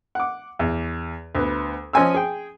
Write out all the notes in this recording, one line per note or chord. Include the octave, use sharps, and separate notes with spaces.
F#5 D6
E2
D2 B3
F3 C#4 D#5 G#5 C6 E6
G#4 G5